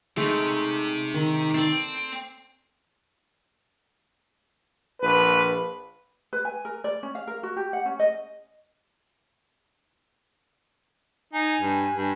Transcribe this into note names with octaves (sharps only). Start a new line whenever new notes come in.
C3 G#3 A3 D#4
D#3
C4 A4 D5
A#1 B4
B4
G#5
A#4
D5
C#4
F5
A#4
F#4
G4
F#5
C#4
D#5
D#4 G#5
G2
G2